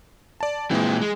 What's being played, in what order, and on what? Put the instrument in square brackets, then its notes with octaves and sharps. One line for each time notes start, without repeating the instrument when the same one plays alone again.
[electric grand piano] D5 A5
[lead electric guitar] A#2 C4 [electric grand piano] E3 G#3
[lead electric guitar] G#3